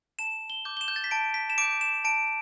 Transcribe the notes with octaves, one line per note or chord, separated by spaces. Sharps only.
A5 E7
G7
D6 G6
G7
E7
G6
A6
B6
A5 D7
B6
E7
D6 G6 D7
E7
A5 D7